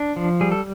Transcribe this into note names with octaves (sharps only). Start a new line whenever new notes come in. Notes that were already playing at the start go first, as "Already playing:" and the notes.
Already playing: D4
F3
G3 G#4
A4